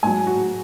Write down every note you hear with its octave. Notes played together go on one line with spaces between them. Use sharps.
G#2 F#3 G#5
F#4